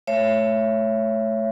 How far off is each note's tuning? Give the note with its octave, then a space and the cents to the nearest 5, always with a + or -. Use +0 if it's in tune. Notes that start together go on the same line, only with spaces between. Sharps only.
A3 -20 C#5 +0 E5 +30